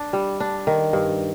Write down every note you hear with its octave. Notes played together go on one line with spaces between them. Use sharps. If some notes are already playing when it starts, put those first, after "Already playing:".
Already playing: D4
G3
D4
D#3
G2